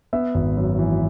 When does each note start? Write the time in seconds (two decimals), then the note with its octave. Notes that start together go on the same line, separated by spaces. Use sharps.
0.13 B3 E5
0.34 G#1
0.57 F#2
0.79 E3